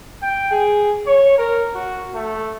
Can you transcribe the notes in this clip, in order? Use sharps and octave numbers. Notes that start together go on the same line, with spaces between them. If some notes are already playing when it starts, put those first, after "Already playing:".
G5
G#4
C#5
A#4
F#4
A3